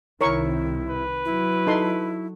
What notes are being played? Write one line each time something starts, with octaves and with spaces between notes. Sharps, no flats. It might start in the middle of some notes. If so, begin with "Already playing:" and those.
C2 C3 D#3 E4 A#4 C#5 C#6
B4
F#3 E4
D#4 A4 C6